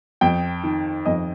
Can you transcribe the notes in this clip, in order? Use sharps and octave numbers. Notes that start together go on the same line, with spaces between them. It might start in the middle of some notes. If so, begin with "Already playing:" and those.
F2 G5
D#3
F2 D#5